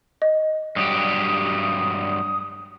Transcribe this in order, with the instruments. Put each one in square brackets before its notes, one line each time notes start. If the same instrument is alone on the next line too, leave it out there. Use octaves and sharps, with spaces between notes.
[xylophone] D#5
[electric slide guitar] G2 F#3 G4 [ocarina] D#6